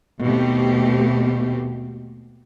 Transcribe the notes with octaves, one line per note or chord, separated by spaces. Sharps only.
D#2 B2 A3 C4 G4